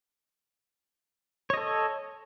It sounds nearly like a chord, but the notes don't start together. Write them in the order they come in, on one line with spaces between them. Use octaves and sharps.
C#5 D#5 A4